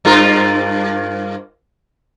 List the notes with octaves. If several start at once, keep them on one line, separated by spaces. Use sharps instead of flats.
G2 F4 A#4